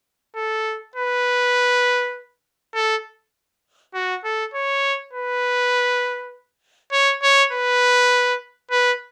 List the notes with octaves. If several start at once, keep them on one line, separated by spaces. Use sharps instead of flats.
A4
B4
A4
F#4
A4
C#5
B4
C#5
C#5
B4
B4